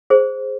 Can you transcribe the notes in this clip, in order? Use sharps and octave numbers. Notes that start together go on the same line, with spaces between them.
G#4 C5